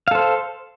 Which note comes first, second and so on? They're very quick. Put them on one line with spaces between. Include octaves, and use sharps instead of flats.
F5 A4 C5